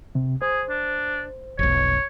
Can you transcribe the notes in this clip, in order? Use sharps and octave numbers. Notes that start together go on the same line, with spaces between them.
C3
G#4 C5
D4
F1 B1 C#5